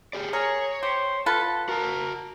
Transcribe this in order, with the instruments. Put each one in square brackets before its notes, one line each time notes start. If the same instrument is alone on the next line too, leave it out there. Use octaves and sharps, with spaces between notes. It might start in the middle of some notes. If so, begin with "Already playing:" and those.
[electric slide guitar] G4 G#4 D5
[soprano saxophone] G#4 [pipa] A#4 [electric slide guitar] C#5
[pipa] G4 [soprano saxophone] C5
[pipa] B3 F4 B4 [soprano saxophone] A4
[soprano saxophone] A4
[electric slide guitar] F#4 A5 [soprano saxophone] A#4